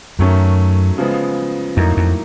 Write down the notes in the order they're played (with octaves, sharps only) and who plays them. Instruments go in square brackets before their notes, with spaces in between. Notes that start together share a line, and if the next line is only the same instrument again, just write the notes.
[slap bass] F#2 [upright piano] D#3 F#3 A3 C#4
[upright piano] C#3 F3 G#3 B3
[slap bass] F2 [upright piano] A2 F#3 A#3 D#4
[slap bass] F2